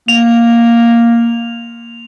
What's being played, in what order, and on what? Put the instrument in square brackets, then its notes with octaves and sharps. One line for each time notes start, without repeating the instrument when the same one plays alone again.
[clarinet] A#3 [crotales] F7